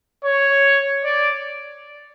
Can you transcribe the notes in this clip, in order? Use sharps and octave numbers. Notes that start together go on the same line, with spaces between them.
C#5
D5